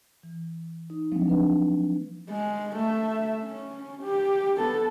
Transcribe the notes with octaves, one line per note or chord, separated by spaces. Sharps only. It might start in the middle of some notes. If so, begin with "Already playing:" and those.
E3
D#4
F3 F#3 G#3 A#3 C4 D4
D4 B4
G#3
A3 E5
C#4
G4
B3 A4